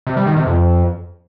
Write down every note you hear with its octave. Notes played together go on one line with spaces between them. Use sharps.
C3
G3
D#3
C3
F2